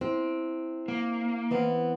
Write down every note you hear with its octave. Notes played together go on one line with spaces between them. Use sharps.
C4 E4
A#3
E3 B3 C4